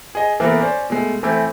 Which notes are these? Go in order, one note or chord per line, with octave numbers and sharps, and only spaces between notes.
G#4 D#5
E3 A#3 B3 A4
C#4 C5 D5
B2 G#3 A3
E3 A3 C4 C#4 E4